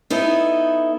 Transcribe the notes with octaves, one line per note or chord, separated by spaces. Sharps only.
B3 D#4 E4 A4